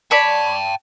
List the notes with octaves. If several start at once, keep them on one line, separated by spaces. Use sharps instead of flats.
C#5 D5 G5 A5 B5